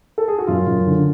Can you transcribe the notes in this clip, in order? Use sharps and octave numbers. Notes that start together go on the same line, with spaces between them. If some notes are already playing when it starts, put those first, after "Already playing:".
A4
G#4
F#4
F#2 F4
F#2
D3